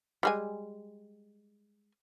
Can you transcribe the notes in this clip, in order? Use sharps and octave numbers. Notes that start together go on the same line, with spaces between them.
G3 G#3 G#5